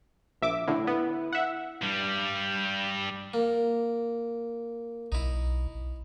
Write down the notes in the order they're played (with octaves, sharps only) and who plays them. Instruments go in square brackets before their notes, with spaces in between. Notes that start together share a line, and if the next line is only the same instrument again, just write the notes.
[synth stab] A#1 E5 D6
[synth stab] A2 D3 [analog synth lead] E4
[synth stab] B3
E5 F#5
[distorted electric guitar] G2 G3
[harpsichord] A#3
[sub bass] B1 [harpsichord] D#4 E4